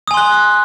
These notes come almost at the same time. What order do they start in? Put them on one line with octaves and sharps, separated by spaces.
D#6 G#5 C6 F#6